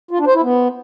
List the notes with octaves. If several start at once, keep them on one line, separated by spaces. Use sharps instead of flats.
F4
D4
C5
E4
B3